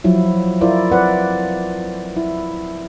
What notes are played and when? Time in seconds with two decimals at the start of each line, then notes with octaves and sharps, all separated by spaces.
0.04 F3 F#3 E4
0.61 E4 F4 A#4 C5 D5
0.92 C4 B4 D5 F#5
2.17 E4